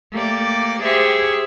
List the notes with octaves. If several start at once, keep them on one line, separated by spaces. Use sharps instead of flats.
A3 A#3 G4 D5
G4 G#4 C5 E5 C#6